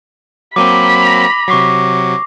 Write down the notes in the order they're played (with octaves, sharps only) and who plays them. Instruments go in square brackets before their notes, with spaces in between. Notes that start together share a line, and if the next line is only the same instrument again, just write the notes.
[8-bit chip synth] F#3 A#3 C4 [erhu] B5 [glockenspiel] D6 D#7 G7
[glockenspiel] A#6 F7
[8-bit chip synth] C3 F#3 [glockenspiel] C#6 D6 C7